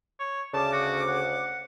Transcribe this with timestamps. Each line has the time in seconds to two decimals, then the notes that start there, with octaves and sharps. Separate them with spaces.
0.19 C#5
0.54 D2 C#3 A5 D6
0.73 F#4
1.08 F#5